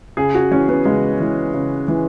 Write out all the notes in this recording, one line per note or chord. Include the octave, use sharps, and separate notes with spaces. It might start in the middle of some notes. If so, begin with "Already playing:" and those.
C#3 G#4
F#4
E3 C#4
B3
C#3 G#3
E3
C#3
E3